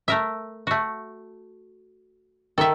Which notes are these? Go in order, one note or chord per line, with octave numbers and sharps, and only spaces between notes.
A3 A#4 E5
A3 F#4
D#3 A4 E5